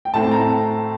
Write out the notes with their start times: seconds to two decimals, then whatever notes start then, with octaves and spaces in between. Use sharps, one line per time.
0.05 G5
0.14 A2 A3 C4 A5
0.31 A#5